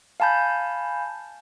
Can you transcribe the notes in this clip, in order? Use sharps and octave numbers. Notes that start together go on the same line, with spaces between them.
F5 G#5 A5 B5 G6